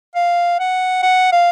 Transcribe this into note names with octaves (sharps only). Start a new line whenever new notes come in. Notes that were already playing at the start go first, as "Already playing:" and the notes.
F5
F#5
F#5
F5